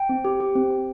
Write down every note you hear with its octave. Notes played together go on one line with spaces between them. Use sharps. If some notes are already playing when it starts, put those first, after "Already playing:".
Already playing: G5
C4
G4
G4
C4
C4